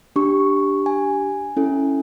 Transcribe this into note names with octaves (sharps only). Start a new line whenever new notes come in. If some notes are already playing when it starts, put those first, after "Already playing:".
D4 G4 C#6
G#5
C#4 E4 A4